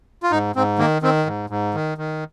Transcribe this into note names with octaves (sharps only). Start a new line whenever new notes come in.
F4
G#2 D#4
G#2 C4
D#3 A#3
D#3 C4
G#2
G#2
D#3
D#3